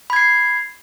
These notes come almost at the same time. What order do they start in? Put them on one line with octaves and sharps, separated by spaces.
B5 G#6 C7